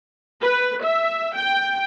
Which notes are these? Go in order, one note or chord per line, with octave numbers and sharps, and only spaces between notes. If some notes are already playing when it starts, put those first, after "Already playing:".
B4
E5
G5